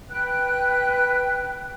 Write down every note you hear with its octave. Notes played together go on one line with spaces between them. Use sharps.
B4 G5 F#6